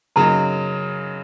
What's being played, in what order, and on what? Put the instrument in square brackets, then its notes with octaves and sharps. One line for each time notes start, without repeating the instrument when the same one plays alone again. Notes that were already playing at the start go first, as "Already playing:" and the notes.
[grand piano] F#2 C#3 F#3 A#3 D#4 [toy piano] A#5